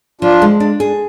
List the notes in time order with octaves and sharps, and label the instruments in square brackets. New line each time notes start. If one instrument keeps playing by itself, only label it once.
[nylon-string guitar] F3 [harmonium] D4 F4
[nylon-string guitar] G#3
D4
G#4